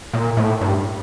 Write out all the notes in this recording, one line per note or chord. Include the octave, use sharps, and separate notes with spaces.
A#2
A2
G2